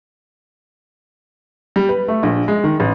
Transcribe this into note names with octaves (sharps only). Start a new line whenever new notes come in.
G3
B4
A3
A#1
G#3
D#3
A1